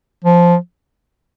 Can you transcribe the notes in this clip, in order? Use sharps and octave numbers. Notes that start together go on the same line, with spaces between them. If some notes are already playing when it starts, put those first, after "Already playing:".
F3